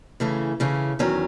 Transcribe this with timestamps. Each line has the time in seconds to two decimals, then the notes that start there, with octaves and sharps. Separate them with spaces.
0.20 C#3 E3 A3 C#4
0.60 C#3 E3 A3 C#4
0.99 E2 D#3 F#3 C#4